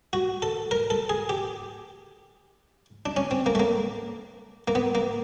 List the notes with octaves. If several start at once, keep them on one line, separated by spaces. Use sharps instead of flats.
F#4
A4
A#4
A4
G#4
G4
D4
C#4
C4
A#3
A3
A#3
A#3
B3
A#3